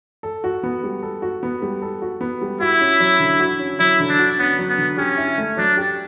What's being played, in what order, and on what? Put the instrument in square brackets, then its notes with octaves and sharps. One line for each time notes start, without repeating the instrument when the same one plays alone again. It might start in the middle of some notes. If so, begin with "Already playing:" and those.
[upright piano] A4
F#4
B3
G3
A4
F#4
B3
G3
A4
F#4
B3
G3
[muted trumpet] E4 [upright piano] F#4
[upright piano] C#4
F#3
D3
F#4
C#4
[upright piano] F#3 [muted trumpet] E4
[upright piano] D3
[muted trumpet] D4
[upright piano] F#4
[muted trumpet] B3 [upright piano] C#4
[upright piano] F#3
[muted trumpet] B3
[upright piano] D3
[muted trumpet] C#4 [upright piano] G4
[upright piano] E4
A3
[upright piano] F#3 [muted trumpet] D4
[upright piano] G4